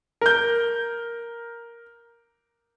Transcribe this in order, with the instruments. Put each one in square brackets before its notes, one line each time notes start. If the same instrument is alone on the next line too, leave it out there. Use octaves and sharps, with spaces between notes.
[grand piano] A#4 G6